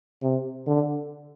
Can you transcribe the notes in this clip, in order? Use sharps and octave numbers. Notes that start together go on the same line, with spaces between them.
C3
D3